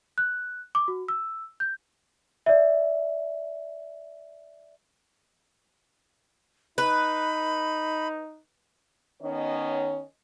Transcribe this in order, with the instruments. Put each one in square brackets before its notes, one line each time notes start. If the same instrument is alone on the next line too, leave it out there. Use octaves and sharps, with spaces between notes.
[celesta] F#6
D6
F#4
E6
G6
D5 E5
[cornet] D#4 [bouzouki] B4 [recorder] B5
[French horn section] D#3 B3 C#4 C#5 D#5